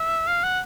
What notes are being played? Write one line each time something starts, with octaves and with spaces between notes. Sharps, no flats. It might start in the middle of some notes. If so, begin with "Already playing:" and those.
Already playing: E5
F5
F#5